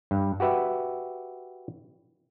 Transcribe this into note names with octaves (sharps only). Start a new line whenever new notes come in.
G2
F#4 G4 B4 E5